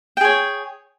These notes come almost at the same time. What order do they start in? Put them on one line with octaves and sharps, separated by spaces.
G5 G#4 C#5